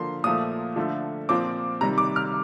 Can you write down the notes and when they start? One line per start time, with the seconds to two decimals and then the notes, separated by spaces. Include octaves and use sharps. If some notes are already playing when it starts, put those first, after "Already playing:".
Already playing: D3 F3 A#3 C6
0.24 A#2 F3 A3 D#6
0.76 D3 F3 A3
1.29 A#2 F3 C4 D6
1.81 C3 D#3 G3 A#5
1.98 D6
2.16 F6